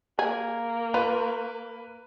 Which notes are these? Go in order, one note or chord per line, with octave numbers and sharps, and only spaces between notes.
A#3 G#4
F4 B4